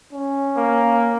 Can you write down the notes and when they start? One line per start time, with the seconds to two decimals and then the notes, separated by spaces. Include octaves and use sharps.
0.13 C#4
0.57 A#3